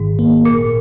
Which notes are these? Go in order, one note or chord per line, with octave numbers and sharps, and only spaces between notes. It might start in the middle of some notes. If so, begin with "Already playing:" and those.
Already playing: G#1 G#2 D#3
A#3
G#1 A#2